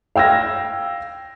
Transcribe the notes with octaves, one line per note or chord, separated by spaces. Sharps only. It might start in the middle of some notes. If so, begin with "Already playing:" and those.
F5 G5 E6 G#6 A#6